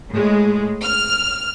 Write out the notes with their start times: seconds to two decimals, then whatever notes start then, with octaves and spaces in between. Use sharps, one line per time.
0.11 A2 G#3
0.82 F6